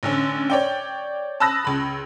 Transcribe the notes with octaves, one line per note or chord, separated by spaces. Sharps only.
A1 D3 C#4
C#5 D5 G5
A5 B5 D#6 E6 F#6 A#6
C#2 B5